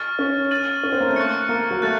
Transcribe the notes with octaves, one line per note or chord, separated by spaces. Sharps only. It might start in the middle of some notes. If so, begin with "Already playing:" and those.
Already playing: C#6 F6 A6
C#4
F6 A6 D#7 F#7
C#4
C4
A#3
A3
C#6 F#6 A6 C#7
A#3
F#3
A3 F#6 A6